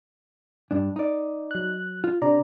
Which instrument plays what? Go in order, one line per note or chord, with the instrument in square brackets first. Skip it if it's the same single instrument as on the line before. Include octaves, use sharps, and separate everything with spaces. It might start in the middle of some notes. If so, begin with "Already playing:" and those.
[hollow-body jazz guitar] G2 D4
D#4 D5
[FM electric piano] F#3 F#6
[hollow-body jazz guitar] F4
[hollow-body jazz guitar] C3 [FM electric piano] D4 D5 A#5